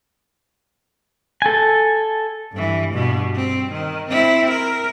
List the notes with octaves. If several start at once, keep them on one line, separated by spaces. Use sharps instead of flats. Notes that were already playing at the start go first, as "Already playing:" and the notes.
A4 G#5
G2 E3
G2 B2
C4
D#3
C4 E4
A#4